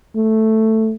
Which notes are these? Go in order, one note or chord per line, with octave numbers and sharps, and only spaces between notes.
A3